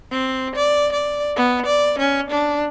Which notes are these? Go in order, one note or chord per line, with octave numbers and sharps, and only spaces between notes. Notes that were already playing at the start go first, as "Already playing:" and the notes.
C4
D5
D5
B3
D5
C#4
D4